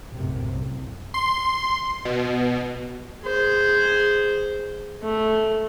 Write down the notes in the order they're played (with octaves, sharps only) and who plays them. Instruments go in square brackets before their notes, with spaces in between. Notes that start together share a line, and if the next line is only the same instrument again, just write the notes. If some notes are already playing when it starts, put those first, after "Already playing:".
[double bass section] B1 F#2 A2 C3
C2
[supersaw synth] C6
B2
[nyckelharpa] G#4 C5
A3